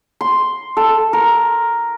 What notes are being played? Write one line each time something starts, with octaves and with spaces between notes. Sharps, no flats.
C6
A4
A#4